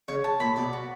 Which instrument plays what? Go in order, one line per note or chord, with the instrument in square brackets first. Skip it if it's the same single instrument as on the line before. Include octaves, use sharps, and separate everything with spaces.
[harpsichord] C#3 [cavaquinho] C#5
[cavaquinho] A5
[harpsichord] A#2 [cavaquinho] B5
[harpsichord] B2 [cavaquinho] D5
[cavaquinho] F#4